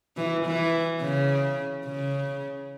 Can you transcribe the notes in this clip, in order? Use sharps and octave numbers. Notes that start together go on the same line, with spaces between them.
E3
E3
C#3
C#3